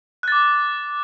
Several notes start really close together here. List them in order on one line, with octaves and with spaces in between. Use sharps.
F#6 A6 D6